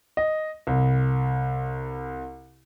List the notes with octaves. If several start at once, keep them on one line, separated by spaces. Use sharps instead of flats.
D#5
C2